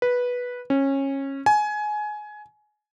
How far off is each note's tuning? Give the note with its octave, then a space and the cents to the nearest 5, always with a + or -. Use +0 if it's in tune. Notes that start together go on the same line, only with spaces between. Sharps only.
B4 -10
C#4 -20
G#5 +20